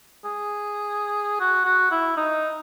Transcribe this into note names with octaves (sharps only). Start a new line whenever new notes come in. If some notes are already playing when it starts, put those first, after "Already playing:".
G#4
F#4
F#4
E4
D#4